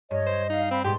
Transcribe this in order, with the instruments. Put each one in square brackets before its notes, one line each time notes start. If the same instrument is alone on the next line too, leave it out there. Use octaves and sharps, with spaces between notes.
[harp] G2 [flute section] C#5 [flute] D#5
[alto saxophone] C5
[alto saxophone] D#4 [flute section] F5
[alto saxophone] C4 [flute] B5
[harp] G#2 B2 [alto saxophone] G4 [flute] C6